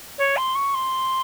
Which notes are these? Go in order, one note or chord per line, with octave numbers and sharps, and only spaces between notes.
C#5
C6
C#6
C6